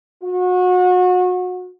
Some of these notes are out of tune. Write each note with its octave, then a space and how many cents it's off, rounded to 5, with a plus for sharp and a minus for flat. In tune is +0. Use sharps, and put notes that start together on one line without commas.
F#4 -30